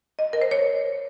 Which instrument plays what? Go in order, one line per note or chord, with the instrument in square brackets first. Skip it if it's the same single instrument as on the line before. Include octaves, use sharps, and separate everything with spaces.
[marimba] D#5
A#4
C5
C#5